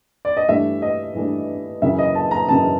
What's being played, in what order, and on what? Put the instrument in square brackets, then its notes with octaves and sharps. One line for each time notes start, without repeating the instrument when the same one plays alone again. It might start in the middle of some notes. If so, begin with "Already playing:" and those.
[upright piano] D5
D#5
G2 E3 A3 D4 E5
D#5
G2 E3 A3 D4
F#2 C#3 E3 E5
D#5
A5
A#5
F#2 C#3 E3 A5